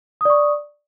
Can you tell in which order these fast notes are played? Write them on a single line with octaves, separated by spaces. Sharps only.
D#6 D5 C#6